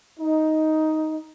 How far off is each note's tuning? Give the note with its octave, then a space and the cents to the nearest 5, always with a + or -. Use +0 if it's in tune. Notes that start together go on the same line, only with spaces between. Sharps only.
D#4 +10